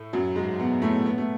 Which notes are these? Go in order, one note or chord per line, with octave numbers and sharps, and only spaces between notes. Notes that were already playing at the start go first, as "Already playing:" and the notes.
Already playing: A2 A3
F#2 F#3
G#2 G#3
B2 B3
A2 A3
B3
A3